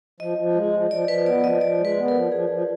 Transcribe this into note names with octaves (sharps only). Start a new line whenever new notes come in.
F3 D#5
F3
G#3
F3
F3 D5
F3 B4
B3 D5
F3 D#5
F3 D5
G#3
B4
B3
A#4
F3
F3 G#4
F3